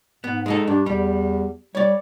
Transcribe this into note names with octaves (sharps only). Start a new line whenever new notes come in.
G#2 B3
G#3 D#4 A4
G2 D4
E2 G3
G3 C#5 D5